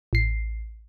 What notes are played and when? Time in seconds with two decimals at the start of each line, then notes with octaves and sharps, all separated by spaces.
0.13 A1 C7